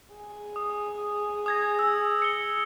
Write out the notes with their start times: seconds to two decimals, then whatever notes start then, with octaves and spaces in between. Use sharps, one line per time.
0.13 G#4
0.56 D#6
1.46 D#6 G#6 A#6
1.79 E6
2.22 C#7 G7